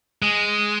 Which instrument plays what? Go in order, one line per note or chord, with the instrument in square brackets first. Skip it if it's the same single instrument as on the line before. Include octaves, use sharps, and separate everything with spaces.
[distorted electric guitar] G#3